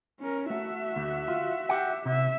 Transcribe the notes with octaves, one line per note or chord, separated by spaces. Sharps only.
C#4 A#4
A3 F#4 E5
D2
F4
G4 F#5
C3 E5